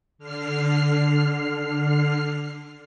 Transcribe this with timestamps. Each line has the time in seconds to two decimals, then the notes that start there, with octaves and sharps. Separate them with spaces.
0.19 D3 F6 C7